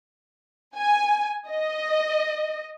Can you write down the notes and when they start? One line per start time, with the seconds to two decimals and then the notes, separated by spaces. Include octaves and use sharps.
0.77 G#5
1.49 D#5